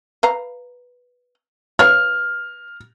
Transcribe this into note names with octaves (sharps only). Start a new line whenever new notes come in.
B4 F5 A#5
B4 C#5 F5 F6